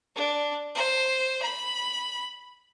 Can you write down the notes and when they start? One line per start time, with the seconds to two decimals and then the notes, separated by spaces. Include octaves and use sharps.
0.16 D4
0.75 C5
1.42 B5